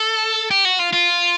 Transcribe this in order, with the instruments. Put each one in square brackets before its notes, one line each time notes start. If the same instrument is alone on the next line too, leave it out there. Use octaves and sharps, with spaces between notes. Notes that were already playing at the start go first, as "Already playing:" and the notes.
Already playing: [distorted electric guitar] A4
G4
F#4
F4
F4